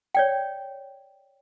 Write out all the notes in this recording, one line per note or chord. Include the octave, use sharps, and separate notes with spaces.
C#5 D5 G5